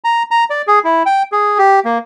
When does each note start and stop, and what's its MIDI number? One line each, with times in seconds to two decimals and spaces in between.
0.04 0.23 82
0.31 0.44 82
0.50 0.62 74
0.67 0.79 68
0.84 1.03 64
1.06 1.23 79
1.32 1.58 68
1.58 1.80 67
1.85 1.98 58